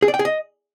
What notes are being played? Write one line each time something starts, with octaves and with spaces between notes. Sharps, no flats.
G#4
D5
G5
G#4
D#5